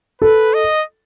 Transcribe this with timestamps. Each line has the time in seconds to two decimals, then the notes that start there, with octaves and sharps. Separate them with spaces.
0.22 A4 B4
0.54 D#5